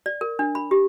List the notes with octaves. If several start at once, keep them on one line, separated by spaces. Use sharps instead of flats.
D5
A#4
D4
B5
G4